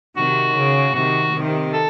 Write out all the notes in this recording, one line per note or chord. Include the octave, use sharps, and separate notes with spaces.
C3 D#3 F#4
C#3
C3 D#3 F#4
C3 D#3
A4